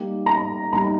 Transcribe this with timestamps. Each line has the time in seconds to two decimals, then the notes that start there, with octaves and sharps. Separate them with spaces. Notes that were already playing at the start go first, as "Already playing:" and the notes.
Already playing: G3 A#3 D#4 G4
0.26 A#5
0.73 G3 A#3 D#4 G4 A#5